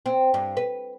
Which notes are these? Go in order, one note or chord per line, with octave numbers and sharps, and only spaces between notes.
C4
G2
B4